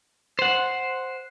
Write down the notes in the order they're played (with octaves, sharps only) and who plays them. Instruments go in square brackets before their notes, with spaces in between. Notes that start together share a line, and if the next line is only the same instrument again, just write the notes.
[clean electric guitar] C5 F#5